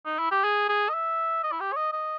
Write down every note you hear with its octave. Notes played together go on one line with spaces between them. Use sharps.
D#4
E4
G4
G#4
G#4
D#5
E5
D#5
E4
G4
C#5
D#5
D#5